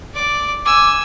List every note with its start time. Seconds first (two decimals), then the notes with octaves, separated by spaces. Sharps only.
0.14 D5 D6
0.65 G#5 D6 E6